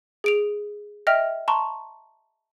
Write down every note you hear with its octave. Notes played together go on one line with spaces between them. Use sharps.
G#4 D7 F7
D#5 E5 G5 F6 B6 F7
A5 A#5 C6 C#6